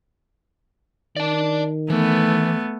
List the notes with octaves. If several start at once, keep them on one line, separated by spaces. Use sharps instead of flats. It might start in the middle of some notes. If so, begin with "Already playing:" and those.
D#3 D5 A5
E3 A3 B3